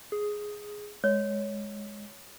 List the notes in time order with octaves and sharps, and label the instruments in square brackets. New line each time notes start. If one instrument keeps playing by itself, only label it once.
[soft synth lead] G#4
[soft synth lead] G#3 [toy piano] C#5